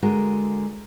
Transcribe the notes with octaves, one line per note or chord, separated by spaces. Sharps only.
D3 G#3 F#4 A#4